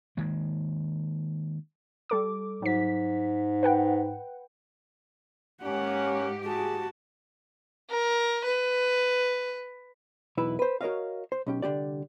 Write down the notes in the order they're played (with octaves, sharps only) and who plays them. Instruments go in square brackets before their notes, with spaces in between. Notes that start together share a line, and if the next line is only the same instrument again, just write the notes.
[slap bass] D#3 G#3 A#3
[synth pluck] G3 A4 D6
[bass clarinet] G#2 [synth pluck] F#3 B6
[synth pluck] B4 F#5 G5
[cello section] G#2 G4 [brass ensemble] A#3 C#4 [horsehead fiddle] F#5
[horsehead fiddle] F#4 A5 [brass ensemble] G#4
[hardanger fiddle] A#4
B4
[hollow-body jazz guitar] B1 E2 E4 B4 E5
B4 C5
F#4 A#4 C#5 D#5 F5
C5
B1 C#4 G4
C2 D3 C#4 G4 D5